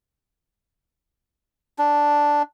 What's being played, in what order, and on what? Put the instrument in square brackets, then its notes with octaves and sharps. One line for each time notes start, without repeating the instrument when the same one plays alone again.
[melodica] D4